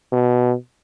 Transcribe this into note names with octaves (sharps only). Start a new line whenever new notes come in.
B2